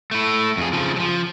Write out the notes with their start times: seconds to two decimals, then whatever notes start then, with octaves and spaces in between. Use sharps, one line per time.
0.11 A3 E4
0.57 F2 G#4
0.73 C#3 F3
0.96 F3 F#3